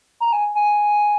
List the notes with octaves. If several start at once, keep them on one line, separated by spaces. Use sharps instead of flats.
A#5
G#5
G#5